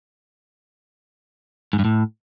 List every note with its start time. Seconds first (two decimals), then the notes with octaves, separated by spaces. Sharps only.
1.73 G#2
1.79 G2
1.85 A2